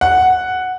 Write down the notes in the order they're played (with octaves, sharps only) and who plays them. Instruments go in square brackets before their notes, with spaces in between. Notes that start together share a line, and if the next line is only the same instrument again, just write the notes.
[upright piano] F#5